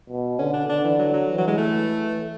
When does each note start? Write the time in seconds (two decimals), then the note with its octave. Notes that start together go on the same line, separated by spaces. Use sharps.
0.10 B2
0.39 D3 C#4
0.54 D4
0.69 D3 D4
0.84 E3
0.99 F#3
1.13 F#3
1.28 E3
1.38 F#3
1.47 G#3
1.57 A3